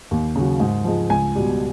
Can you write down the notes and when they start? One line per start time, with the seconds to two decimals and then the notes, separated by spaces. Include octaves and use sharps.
0.11 D#2
0.36 C#3 F#3
0.60 G#2
0.85 F3 G#3
1.10 C#2 G#5
1.35 B2 G3